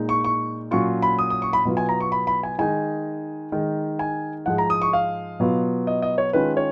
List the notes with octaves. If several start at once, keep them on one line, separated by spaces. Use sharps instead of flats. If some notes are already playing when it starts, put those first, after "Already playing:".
Already playing: A#2 G#3 D#4
C#6
C#6
A#2 F#3 C#4 F4 C#6
B5
D#6
D#6
C#6
B5
B2 F#3 B3 F4
G#5
A#5
C#6
B5
B5
G#5
D#3 G#3 D#4 G#5
D#3 G#3 D#4
G#5
G#2 F3 G#3 F#5
A#5
D#6
C#6
F5
B2 F#3 B3 F4
D#5
D#5
C#5
D#3 G#3 C#4 F4 B4
C#5